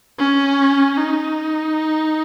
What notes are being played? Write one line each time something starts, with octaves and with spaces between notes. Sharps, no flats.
C#4
D#4